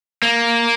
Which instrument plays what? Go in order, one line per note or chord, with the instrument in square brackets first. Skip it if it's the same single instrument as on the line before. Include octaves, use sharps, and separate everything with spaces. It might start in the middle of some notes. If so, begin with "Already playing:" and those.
[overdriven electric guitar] A#3